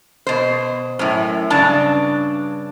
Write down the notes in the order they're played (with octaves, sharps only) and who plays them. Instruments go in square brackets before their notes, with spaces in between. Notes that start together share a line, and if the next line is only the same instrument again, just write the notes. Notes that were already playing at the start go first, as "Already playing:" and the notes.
[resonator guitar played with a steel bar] B2 C5
F#2 A2
G2 C#3 D4 A5